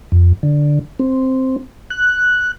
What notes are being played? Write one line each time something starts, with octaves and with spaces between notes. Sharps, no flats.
F2
D3
C4
F#6